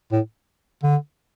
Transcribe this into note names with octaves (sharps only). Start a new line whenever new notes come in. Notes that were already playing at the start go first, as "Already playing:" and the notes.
A2
D3